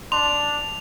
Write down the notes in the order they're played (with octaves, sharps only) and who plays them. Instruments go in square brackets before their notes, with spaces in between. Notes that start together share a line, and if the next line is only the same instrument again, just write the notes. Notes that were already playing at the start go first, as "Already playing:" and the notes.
[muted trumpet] D4 [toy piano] C6 [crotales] F7